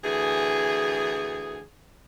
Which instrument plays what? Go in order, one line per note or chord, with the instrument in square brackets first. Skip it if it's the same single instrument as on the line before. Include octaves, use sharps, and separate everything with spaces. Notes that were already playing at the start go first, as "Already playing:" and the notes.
[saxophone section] D2 E3 G#4